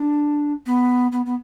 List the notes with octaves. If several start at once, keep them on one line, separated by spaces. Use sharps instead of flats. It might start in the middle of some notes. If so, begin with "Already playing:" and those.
Already playing: D4
B3
B3
B3